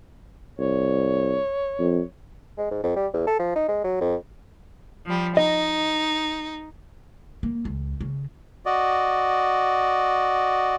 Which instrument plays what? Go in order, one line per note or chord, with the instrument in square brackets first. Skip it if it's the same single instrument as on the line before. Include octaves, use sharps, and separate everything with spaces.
[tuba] C2 [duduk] C#5
[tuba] F2
[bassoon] G#3
G#2
F2
G3
E2
A4
F3
D#4
G#3
F#3
F2
[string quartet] F3 G3
[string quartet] D#4 [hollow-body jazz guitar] D#5
[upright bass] A#3
C#2
C#3
[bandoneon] F#4 D5 D#5